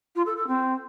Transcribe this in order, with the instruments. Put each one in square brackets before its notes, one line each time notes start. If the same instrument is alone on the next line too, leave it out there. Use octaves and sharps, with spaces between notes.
[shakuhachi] F4
A4
A4
C4